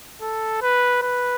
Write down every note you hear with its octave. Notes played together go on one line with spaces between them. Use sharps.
A4
B4
B4